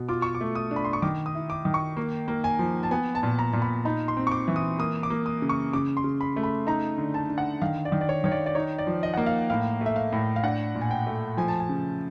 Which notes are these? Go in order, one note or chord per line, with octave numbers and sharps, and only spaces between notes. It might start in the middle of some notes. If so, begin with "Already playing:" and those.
Already playing: B2
F4 D6
C#6
D6
A3
D#6
D4
B5
C6
C#6
D#3 D6
D#6
E4
D6
D#3
C#6
A#3
A#3
G#5
F3
A5
B3 G#5
A5
A#2
A#5
A#2
B5
D#4 B5
C6
C4
C#6
D6
E3
D#6
A#3 D#6
D6
A#3
D#6
C#3
C#6
C#3 D6
C6
C#3
B5
A3
B5
D#4 A#5
D3
A5
D3
F#5
D#3 F5
D5
D#3
D5
C#5
D#3 C#5
D5
D5
D#4 C#5
D5
F3
D#5
A#3 F#5
F5
A2 F5
A3
E5
F5
A2
F5
D4 F#5
A#2
G#5
G5
A3
F3 G#5
A5
G#5
C#3